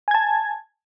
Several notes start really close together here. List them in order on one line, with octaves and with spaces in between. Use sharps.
G#5 G#6 A5